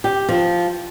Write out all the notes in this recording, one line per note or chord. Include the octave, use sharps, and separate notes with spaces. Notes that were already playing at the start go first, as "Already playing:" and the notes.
G4
F3